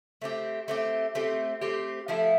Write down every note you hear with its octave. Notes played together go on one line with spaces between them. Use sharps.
A3 C4 G4
A3 C4 G4
A3 C4 G4
A3 C4 G4
F3 A3 E4 A4